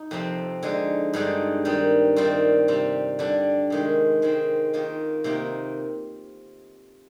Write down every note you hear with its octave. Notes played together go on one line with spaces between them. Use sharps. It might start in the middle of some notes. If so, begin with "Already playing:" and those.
Already playing: D#4
F2 C3 F3 C4
D3 G#3 D#4
G2 D3 G#3 D#4
D#3 G3 C4 D#4
D#3 G3 C4 F4
C3 G3 C4
D3 G3 D4
C3 D#3 G#3
D#3 G#3 C4
D#3 A#3 F4
C3 D#3 A#3 F4